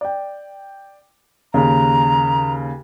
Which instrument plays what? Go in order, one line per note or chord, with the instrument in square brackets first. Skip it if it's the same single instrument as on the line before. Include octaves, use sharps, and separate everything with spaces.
[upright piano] D5 G5
[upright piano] D#2 C#3 [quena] A#5